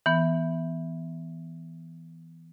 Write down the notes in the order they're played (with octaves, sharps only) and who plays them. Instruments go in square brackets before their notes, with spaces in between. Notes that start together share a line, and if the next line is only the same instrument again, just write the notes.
[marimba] E3 B3